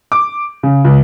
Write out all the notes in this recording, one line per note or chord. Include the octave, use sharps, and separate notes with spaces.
D6
C#3
C#2